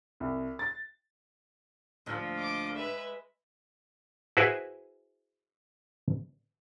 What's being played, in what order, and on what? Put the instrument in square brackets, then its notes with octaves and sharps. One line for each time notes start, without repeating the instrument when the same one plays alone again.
[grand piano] C2
A6
[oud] D2 A#2 [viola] F3
[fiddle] D#5 D6
[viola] G#3 [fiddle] B4 E5
[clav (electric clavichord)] E4 F#4 G#4 B4 C5 E5